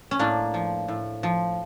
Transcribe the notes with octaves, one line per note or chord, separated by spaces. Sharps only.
C#4
A2 A#3 D4
F3
A2
F3